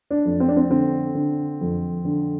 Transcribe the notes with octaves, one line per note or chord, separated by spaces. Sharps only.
D4
F2
C4
D4
C4
D3 C4
D3
F2
D3